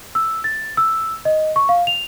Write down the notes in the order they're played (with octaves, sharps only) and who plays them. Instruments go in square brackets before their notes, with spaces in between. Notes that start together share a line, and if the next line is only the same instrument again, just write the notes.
[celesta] E6
A6
E6
D#5
C#6
F5
F7